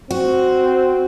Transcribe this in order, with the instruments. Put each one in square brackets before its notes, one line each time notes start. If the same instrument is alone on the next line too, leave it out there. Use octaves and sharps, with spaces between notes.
[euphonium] C4 [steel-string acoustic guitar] F#4